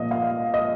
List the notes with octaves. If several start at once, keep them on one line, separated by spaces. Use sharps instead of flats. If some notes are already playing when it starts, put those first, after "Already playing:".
Already playing: A#2 F3 D#5
F5
D#5